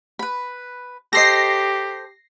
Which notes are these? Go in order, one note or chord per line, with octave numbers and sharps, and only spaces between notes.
B4 B5
G4 A4 C5 D#5 A#6 C7